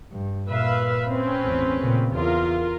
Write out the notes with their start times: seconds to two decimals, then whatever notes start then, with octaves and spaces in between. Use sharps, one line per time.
0.12 G2
0.48 A#2 B4 E5 F5
1.10 C4 C#4 B4
1.42 A1 E2
1.80 A#2 C#3
2.14 E2 F4 A#4